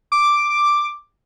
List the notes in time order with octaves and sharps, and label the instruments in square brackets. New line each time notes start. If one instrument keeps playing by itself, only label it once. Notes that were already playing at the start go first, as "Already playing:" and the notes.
[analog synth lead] D6